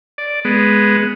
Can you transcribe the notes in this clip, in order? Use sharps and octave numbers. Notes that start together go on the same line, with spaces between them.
D5
G#3 B3